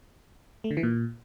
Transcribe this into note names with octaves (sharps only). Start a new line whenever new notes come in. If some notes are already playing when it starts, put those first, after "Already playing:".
A3
D3
E3
A#2